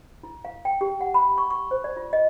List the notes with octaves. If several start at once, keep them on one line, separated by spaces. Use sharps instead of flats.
E4
F5
G5
G4
F#5
B5
C#6
C#6
C5
D5
F4
D#5